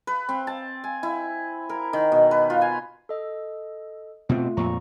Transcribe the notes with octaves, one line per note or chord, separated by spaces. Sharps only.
B4
C4
A5
G#5
E4
A#4
D#3
B2
B4
F4
G#5
A4 D#5 E6
B2 A3 C4 F4
F2 A#2 A#5 C#6